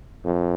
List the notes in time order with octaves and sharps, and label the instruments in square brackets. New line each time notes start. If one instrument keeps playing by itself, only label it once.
[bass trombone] F2